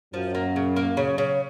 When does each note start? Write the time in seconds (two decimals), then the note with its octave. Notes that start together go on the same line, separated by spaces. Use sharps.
0.14 F#2 F3 F#3
0.35 A#3
0.56 C#3
0.76 A#3
0.97 C#3
1.18 C#3